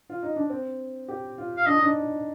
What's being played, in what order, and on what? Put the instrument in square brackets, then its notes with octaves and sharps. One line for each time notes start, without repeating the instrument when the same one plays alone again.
[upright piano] F4
D#4
D4
C4
G4
F4
[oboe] F5
[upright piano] D4 [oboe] D#5
[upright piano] D#4
D4